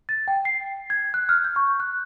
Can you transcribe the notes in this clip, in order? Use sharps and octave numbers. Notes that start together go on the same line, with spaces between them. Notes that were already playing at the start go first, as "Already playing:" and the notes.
A6
G5
C7
G#6
F#6
F6
G6
C#6
F#6